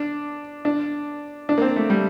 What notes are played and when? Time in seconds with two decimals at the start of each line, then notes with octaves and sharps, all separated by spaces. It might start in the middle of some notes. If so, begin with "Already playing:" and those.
Already playing: D4
0.65 D4
1.49 D4
1.58 A#3
1.62 C4
1.76 A3
1.90 G3